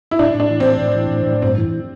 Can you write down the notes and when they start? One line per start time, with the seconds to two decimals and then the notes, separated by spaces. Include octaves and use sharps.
0.11 E4
0.19 A2 D4
0.34 A2
0.40 D4
0.50 E3
0.60 C4
0.65 A2
0.81 A2
0.96 E3
1.11 A2
1.26 A2
1.42 G2 C4
1.58 E3